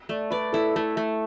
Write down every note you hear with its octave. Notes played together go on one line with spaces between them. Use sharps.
A3 D5
B4 D5
E4 A4
A3 A4
A3